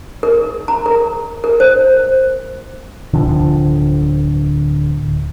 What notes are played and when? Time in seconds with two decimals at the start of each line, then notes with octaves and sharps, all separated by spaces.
0.23 A#4
0.68 A#5
0.86 A#4
1.44 A#4
1.60 C5
3.13 D1 D3 F3